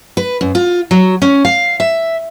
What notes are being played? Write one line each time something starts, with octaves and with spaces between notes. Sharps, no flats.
B4
F#2
F4
F#3
C#4
F5
E5